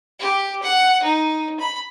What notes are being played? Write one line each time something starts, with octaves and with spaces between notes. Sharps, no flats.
G4
F#5
D#4
B5